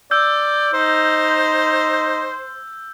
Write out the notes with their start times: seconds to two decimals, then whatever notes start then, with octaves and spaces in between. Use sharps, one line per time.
0.11 D5 E6 G6
0.73 D#4 C5